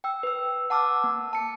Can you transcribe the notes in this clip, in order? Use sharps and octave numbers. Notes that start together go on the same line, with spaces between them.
G5 E6
B4 E6
F#5 A5 D6 E6 F6
A#3
A5 C#7